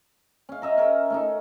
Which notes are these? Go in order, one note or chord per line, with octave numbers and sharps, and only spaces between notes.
C#4 F5
D#5 E5 A#5
C#4 A#4 E5
A3 C#4 D#4